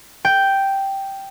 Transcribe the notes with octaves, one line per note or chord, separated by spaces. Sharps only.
G5